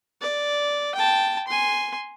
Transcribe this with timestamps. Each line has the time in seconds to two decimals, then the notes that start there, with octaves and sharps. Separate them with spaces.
0.21 D5
0.95 G5 A5
1.48 G#5 C6